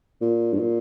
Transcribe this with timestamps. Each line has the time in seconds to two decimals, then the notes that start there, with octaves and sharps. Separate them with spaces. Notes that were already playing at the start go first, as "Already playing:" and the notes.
0.21 A#2
0.53 G2
0.59 A#2